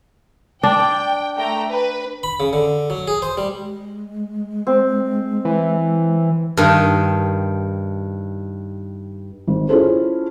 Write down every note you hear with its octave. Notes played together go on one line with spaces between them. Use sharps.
D4 G5
A3 G5 A#5
B4
B5
C#3
D3
F#3
G#4
C5
G3
G#3
C4
E3
G2 D#3
G#1
C#4 E4 F4 G#4 A4 C5